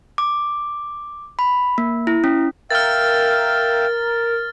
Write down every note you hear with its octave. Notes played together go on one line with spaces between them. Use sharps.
D6
B5
A#3
E4
C#4
A#4 E5 F5 G5 F6 A6